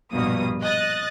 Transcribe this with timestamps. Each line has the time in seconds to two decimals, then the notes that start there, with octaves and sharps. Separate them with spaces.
0.12 A#1 G2 B2 A#3 D#6
0.62 D#5 D#6 F#6 A6